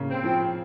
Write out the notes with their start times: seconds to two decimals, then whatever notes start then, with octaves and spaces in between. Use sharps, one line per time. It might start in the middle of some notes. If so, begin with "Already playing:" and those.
Already playing: C#3 A#3
0.09 C4
0.23 F3